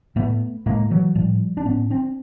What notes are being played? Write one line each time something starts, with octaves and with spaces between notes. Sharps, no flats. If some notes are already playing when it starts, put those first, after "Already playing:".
A2 A3 B3
A2 G#3 A#3
E3 F#3
A2 F3 G3
D4
A2 B3 C#4
C4 D4